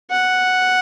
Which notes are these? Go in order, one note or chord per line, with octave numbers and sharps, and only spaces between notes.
F#5